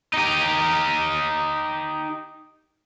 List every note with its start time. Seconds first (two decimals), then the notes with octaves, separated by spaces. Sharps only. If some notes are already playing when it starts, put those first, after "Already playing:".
0.14 D#4 G4